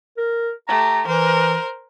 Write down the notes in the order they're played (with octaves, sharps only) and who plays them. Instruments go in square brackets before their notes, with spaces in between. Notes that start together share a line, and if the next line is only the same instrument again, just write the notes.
[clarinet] A#4
[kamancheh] A3 G4 [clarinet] A#5
[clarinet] E3 [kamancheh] A#4 C5